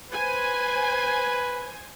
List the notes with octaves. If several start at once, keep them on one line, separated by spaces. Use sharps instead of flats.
B4 C5 G#5